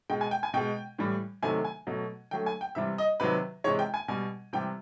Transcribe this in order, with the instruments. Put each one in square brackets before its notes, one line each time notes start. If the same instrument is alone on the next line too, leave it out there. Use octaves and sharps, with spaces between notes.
[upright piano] B2 G#3 G5
G#5
G5
G#5
B2 G#3 G5
A2 E3 G3
C3 D#3 F#3 A3 G#5
G#5
B2 F#3 A3
D3 F#3 A3 G5
G#5
G5
C3 E3 G3 E5
D#5
C3 D#3 F#3 B4
C3 E3 G#3 C#5
G5
G#5
B2 G3 G#5
C3 E3 G3 G5